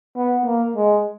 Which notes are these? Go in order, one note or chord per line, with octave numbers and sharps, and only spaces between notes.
B3
A#3
G#3